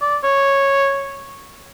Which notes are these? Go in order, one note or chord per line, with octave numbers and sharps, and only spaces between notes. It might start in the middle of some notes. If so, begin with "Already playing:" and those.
D5
C#5